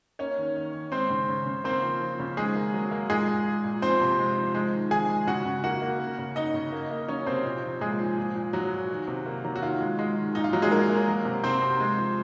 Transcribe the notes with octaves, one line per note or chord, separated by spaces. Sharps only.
A#3 C#4 C#5
D#3
D#3
D#3
G#3 C4 C5
C#3
C#3
C#3
A#3 C4 C5
F3
F3
C#3
D#3 G#3 G#4
A#3
F#3
A#3
A#2 G#3 G#4
G#3
G#3
A#2
F3 C4 C5
C3
G#3
F3
G#3
D#3
D#3 G#4 G#5
G#3
C#3 F#4 F#5
C#3
A#3 F#4 F#5
A#3
A#3
C#3
C#3 D#4 D#5
C#3
A#3
A#3
F#3 C#4 C#5
C3 C4 C5
A#2
F3
A#2 G#3 G#4
F3
A#2
A#2
A#2 F#3 F#4
A#2
D#3
C3
A#3
F#3
F#4
D#3 F4
G#3
G#3
D#3
A#2 D#4
F4
A#2 F#3 F#4
G#3 G#4
F#3 A#3 A#4
A#3
F#3
C3
C3 C4 C5
C3
G#3
F3